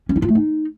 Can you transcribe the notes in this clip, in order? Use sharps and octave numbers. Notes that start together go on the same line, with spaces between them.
C#4
E4
F4
A3
D#4